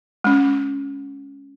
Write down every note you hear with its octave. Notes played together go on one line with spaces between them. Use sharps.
G#3 C#4